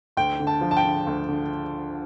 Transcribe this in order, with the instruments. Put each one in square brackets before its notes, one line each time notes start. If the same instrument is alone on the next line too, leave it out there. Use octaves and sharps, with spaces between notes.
[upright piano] D2 G5
D3
A5
F3
A5
G5
D3
D2
D3